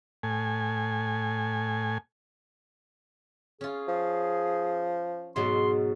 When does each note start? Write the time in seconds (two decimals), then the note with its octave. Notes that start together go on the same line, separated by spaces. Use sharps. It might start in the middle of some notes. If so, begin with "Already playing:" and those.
0.23 A2 G#5
3.61 C#4 F4 G#4
3.88 F3
5.36 G#2 B2 F#3 C6